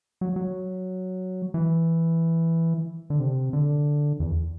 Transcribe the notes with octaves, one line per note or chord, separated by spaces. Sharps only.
F#3
F#3
E3
D3
C3
D3
E2